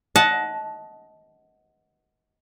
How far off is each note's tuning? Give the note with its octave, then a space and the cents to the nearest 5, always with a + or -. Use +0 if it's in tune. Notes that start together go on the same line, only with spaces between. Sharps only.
D#5 +20 F#5 +0 A5 -15